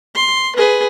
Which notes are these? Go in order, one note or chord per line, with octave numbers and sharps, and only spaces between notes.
C6
G#4 B4